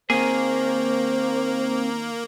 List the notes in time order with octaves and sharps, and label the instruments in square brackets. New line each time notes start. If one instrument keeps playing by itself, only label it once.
[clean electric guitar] D#3 G#4 [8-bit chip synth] A#3 [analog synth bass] C4 [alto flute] C5